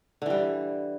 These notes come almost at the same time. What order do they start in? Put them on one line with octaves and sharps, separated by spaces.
D3 E3 G3